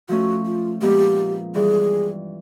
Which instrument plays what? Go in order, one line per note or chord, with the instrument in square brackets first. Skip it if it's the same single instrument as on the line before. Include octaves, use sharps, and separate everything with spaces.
[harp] F3 A3 C#4 [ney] F#4
[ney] F4
[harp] A#2 F3 G#3 B3 [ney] G4
[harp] G2 E3 G3 [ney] G#4